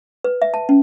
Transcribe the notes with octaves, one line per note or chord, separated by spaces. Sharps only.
B4
E5
A5
C#4